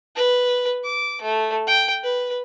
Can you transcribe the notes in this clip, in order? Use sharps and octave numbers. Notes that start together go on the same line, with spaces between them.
B4
D6
A3
G5
B4